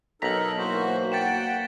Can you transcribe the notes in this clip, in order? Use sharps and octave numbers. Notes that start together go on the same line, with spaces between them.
B1 D#4 A4 A#4 A#5 B6 F#7
E3 A#3 F#4 C5
F#5 G5 A6 B6 E7